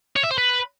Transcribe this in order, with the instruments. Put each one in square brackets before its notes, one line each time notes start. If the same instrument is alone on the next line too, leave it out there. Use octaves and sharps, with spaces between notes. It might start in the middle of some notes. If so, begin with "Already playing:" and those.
[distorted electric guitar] C#5
E5
C5
B4